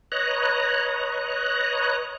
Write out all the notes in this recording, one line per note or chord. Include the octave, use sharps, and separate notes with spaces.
B4 C#5 D#5 A#5 F#6